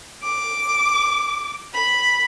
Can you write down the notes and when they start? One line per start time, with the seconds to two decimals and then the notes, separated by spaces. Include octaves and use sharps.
0.24 D6
1.74 B5